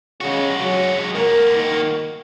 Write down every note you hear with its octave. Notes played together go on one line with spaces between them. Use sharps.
C#3 G#3 F#4
F#3
A#3 F#4 A#4
D#3